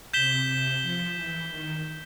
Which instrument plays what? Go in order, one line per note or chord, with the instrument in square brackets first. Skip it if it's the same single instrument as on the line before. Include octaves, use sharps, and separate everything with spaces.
[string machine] C3 [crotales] G6 B6 E7 G7
[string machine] C3
F3
E3
D#3